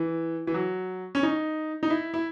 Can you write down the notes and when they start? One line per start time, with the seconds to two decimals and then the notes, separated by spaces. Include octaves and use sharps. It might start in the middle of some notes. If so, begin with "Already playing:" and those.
Already playing: E3
0.47 E3
0.54 F#3
1.15 C#4
1.23 D#4
1.83 D#4
1.90 E4
2.14 E4